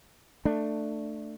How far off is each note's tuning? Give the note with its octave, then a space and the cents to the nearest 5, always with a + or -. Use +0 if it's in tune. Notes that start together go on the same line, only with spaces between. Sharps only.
A3 +10 D4 +20